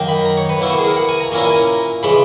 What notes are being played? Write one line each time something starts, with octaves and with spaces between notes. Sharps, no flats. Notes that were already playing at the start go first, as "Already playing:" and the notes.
Already playing: F#2 D#3 A#3 D#4
B5
A#5
C#5
B4
B2 A#3 E4
F#4
G#4
A#4
F#5
G#5
A#5
A#2 A#3 C#4 E4 A#5
G#5
A#5
C#3 E3 G#3 B5